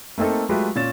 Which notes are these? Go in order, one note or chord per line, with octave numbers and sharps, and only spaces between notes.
A3 A#3 C4 D#4 A4
F#3 G#3 A3 F4 G4 B4
A#2 C#4 A6 E7